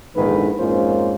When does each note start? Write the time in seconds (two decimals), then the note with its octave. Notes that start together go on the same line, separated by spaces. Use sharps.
0.16 A#1 E2 G#2 D3 D#3 B4
0.58 F2 G#2 A#3 C#4 F4 C5